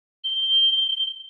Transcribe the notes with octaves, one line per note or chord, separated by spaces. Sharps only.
G7